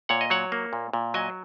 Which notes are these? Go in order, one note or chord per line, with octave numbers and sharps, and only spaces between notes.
A#2 C#5 F#5
D#5
F#3 C#5 F#5
A#3
A#2
A#2
F#3 D#5 G#5